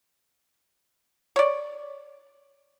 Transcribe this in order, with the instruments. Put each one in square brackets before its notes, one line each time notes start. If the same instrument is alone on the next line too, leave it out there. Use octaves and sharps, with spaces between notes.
[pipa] C#5 D5